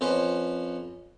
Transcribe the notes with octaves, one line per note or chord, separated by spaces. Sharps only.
F2 C#4 B4 C5